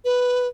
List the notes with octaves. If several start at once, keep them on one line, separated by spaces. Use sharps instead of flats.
B4